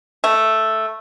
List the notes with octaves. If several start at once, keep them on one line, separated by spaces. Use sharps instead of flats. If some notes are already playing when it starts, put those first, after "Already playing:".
A3